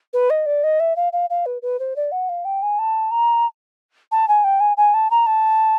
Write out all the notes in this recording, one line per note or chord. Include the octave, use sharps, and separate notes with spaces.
B4
D#5
D5
D#5
E5
F5
F5
F5
B4
B4
C5
D5
F#5
F5
G5
G#5
A5
A#5
A5
G#5
G5
G#5
G#5
A5
A#5
A5